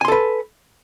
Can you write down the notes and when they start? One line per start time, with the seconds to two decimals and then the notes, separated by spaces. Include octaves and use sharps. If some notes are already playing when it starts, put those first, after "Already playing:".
0.01 G#5
0.05 C6
0.08 A4
0.12 B4